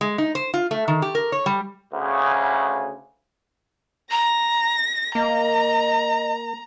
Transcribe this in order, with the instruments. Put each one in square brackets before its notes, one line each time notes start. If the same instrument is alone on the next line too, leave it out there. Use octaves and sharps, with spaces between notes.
[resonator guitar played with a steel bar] G#3
D#4
C5
F4
A3
D#3
G4
A#4
C#5
G3
[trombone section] D2 C#3
[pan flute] A#5 [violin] A#6
[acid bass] A#3 [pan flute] D#5 [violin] A#5